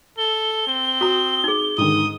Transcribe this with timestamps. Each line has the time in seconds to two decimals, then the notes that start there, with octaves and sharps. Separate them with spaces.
0.18 A4 G7
0.67 C4
1.01 F#4 A#5 D#6
1.44 D#4 G#4
1.78 G#2 D3 D#3 D#6